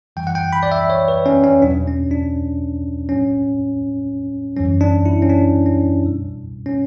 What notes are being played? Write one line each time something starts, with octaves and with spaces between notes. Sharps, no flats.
F#2 E3 G3 G5
F#5
G5
B5
D5
E5
C#5
B4
C#4
C#4
E2 B2 F#3 D4
C#4
D4
A2 F#3 C#4
F#2 E3 G3 C#4
D4
E4
C#4
D4
C#4
B2 G3
C#4